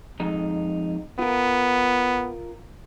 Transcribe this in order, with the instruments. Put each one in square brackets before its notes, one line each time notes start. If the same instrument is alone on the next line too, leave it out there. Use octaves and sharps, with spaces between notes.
[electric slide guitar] F2 G#3 D#4
[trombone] B3 [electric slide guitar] F4 A#4